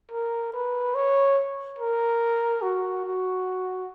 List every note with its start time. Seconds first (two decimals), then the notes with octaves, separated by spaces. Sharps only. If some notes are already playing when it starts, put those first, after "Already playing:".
0.12 A#4
0.54 B4
0.95 C#5
1.79 A#4
2.62 F#4
3.05 F#4